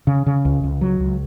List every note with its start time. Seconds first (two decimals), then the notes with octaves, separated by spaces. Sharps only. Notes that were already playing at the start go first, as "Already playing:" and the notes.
0.07 C#3
0.26 C#3
0.45 C#2
0.64 C#2
0.81 F#3
1.00 C#2